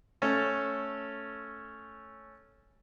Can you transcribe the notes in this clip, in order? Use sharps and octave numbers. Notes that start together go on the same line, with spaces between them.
A3 C#4 A4